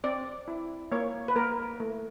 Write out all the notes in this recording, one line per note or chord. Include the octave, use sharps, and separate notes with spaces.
C4 D5
E4
A#3 C#5
B4
A#3 A#4
A3